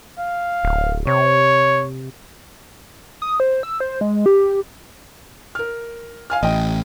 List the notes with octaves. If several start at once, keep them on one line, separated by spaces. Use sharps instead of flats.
F5
D1
C3 C#5
D#6
C5
E6
C5
G#3
G4
A#4 F6
F5 G#5 F6
A1 D#5 G5